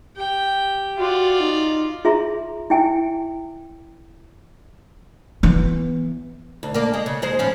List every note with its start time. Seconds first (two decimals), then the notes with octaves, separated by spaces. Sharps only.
0.17 G4 G5
0.97 F4 F#4 D5
1.40 D#4
2.05 F4 G#4 E5 A#5 C6
2.70 E4 E5 G5 G#5
5.43 E3 B3
6.63 D2
6.74 A#3 D4
6.94 G#3
7.06 C#3
7.22 D#2 G#3 C5
7.39 A2 F3 C#4